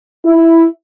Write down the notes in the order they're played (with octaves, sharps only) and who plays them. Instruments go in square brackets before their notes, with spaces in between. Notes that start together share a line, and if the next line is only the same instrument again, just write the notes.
[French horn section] E4